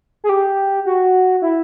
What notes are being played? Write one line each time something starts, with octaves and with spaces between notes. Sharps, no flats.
G#4
G4
F#4
E4